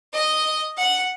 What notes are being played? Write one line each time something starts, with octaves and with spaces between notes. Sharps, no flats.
D#5
F#5